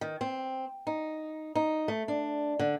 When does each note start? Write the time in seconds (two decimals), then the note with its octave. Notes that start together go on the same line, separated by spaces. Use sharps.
0.01 D#3
0.21 C4
0.87 D#4
1.55 D#4
1.88 A3
2.08 D4
2.59 D3